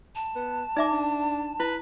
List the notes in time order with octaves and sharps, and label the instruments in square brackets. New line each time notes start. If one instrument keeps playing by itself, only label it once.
[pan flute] A5
[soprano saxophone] B3
[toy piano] D#4 E5 D6 [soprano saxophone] D5
[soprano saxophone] D4
[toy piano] E4 [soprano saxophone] B4